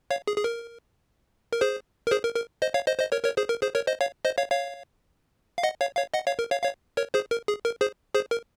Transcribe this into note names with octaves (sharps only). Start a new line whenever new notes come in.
C#5 F5
G#4
G#4
A#4
A#4
G#4 C5
A#4
G#4 C5
A#4
A#4
C5 D#5
C#5 F5
C5 D#5
C5 D#5
A#4 C#5
A#4 C#5
G#4 C5
A#4
G#4 C5
A#4 C#5
C5 D#5
C#5 F5
C5 D#5
C#5 F5
C#5 F5
F5
D#5 F#5
C#5 F5
C#5 F5
D#5 F#5
C#5 F5
A#4
C#5 F5
C#5 F5
A#4 C#5
G#4 C5
A#4
G#4
A#4
G#4 C5
G#4 C5
A#4